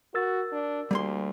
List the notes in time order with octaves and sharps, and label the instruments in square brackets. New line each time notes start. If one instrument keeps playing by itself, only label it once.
[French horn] F#4 [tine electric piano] A#4 E6 A6
[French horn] D4
[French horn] D2 [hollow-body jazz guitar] G3 A#3 C6